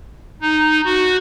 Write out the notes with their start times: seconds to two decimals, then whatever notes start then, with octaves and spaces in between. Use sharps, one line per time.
0.42 D#4
0.85 F#4